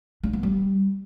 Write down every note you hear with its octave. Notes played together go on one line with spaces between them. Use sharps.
D4
B3
G3